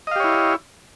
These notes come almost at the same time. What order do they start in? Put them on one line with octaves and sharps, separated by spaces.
D#5 F5 G4 C#5 E4